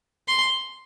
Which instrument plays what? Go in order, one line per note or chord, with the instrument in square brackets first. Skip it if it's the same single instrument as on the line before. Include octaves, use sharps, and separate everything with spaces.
[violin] C6